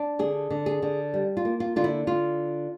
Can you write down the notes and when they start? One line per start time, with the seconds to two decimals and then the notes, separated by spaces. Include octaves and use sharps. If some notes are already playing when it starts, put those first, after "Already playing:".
Already playing: D4
0.19 D3 G#4
0.50 D3
0.66 G#4
0.82 D3
1.14 G3
1.37 F4
1.45 A#3
1.60 F4
1.76 D3 F4
1.84 E4
2.07 D3 F4